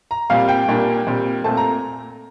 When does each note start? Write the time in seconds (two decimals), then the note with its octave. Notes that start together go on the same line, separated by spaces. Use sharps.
0.11 A#5
0.30 A#2 G3 C4 F5
0.49 G5
0.68 A#2 G3 A#3 D4
1.07 A#2 G3 C4
1.44 A#2 A3 C4 A5
1.57 A#5